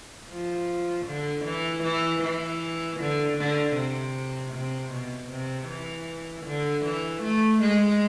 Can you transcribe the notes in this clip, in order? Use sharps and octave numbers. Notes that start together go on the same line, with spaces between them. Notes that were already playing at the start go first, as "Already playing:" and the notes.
F3
D3
E3
E3
E3
D3
D3
C3
C3
B2
C3
E3
D3
E3
A3
G#3